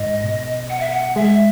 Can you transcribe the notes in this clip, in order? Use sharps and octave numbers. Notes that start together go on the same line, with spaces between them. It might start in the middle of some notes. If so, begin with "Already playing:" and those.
Already playing: G#2 D#5
B2
F#5
E5
F#5
G#3 E5